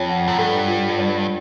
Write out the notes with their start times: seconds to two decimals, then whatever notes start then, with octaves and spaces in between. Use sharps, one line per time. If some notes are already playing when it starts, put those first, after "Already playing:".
Already playing: F2 F4 C#5
0.09 F#5
0.28 F#2
0.38 G2 A4
0.68 F4
0.97 C#5